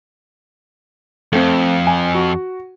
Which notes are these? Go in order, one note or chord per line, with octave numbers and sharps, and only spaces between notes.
F2 A3 C4
G#5
F#4